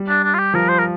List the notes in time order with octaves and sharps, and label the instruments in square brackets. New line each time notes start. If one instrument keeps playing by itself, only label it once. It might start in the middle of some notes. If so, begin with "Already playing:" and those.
Already playing: [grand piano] G3
[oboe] D4
D4
F4
G4
[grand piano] F3 [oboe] A#4
[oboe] C5
A#4